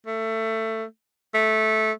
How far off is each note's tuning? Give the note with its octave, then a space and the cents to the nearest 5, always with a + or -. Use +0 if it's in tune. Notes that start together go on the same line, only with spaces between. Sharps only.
A3 +20
A3 -15